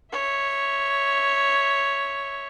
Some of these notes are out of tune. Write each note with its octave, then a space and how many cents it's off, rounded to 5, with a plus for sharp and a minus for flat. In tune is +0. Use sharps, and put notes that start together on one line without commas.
C#5 +0 E5 -10